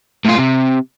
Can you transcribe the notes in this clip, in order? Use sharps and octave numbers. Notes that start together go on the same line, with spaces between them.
A2 F4
C3